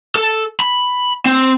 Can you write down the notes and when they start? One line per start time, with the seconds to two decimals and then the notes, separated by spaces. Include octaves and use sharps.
0.16 A4
0.60 B5
1.26 C4